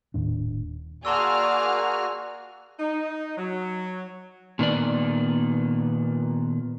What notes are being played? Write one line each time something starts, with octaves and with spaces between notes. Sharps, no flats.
D#1 D#2 A2 D4
A#3 F#4 G#4 D5 A5 C6 E6 F6
D#4
F#3
A#2 D#3 B3 D5